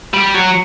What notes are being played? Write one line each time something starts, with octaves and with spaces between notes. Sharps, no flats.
G3
F#3